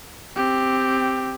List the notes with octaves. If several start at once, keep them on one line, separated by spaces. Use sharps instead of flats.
C4 G4